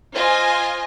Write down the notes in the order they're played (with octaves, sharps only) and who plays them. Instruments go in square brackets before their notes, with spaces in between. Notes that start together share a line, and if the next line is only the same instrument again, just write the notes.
[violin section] F4 C5 D#5 G#5